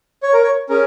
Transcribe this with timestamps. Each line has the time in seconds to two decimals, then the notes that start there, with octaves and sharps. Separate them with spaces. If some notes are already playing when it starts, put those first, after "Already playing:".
0.23 C#5
0.33 A#4
0.43 C#5
0.69 C#4 G#4 A#4